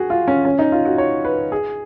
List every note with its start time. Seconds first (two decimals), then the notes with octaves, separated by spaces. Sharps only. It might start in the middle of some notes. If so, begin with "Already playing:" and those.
Already playing: F#4 G#4
0.10 F4
0.28 C#4
0.45 C#4
0.59 D#4
0.72 F4
0.85 F#4
0.98 C#5
1.25 B4
1.52 G#4